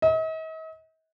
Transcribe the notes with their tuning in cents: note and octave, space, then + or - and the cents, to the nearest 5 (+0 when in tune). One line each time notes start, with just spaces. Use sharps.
D#5 +45